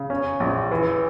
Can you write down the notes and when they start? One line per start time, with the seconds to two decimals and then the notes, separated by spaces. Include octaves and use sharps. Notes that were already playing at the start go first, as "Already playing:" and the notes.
Already playing: C#3
0.10 C#4
0.40 A#1
0.71 E3